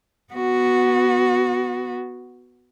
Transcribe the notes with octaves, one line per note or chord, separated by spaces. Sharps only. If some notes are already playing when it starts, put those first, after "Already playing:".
B3 F#4